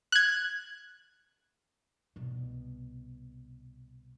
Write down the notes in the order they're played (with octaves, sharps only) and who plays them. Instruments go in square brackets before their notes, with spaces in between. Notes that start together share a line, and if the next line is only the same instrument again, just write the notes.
[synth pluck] F#6 G#6
[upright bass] C2 B2